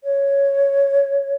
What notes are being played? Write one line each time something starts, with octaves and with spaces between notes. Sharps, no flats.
C#5